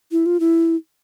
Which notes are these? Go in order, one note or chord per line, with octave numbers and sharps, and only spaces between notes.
E4
F4
E4